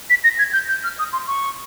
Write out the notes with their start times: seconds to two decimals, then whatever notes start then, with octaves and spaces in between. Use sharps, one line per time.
0.10 B6
0.24 A#6
0.39 G#6
0.53 G6
0.68 G6
0.84 F6
0.99 D#6
1.13 C6
1.27 C#6